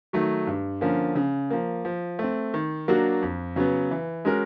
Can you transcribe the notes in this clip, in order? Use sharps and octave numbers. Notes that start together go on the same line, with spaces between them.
D#3 F#3 A3
G2
D3 F3 A#3 C#4
C#3
F3 A#3
F3
A3 C4
D#3
F#3 A#3 D4 F#4
F2
C#3 F#3 B3
E3
G#3 C#4 F#4 A#4